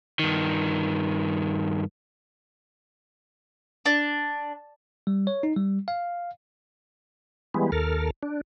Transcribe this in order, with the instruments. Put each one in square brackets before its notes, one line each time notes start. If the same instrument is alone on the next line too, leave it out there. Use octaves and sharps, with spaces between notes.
[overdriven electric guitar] G2 D#3
[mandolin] D4
[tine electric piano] G3
C#5
D#4
G3
F5
[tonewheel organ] E3 G3 G#3 B3
D#2 A4 A#4 F6
D4